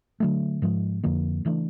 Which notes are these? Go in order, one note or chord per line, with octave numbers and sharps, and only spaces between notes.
D3 F#3 A3
G#2 F3 G#3
F2 D3 F3 A#3
C#3 E3 A3 D4